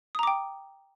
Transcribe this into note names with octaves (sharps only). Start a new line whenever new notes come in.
G5 A#5 D6 D#6